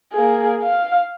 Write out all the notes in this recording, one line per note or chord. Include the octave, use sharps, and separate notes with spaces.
A#3 G#4
F5